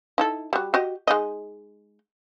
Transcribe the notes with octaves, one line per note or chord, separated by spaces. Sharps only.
D#4 E4 A4
G3 F#4
F#4 G4 D#5
G#3 D#4 D#5